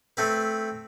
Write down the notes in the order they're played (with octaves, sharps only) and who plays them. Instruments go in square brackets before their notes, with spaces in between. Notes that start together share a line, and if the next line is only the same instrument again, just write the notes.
[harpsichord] A3 C4 B4